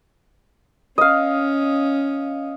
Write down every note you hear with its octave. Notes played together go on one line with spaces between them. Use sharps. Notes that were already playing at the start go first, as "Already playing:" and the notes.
C#4 D#5 F5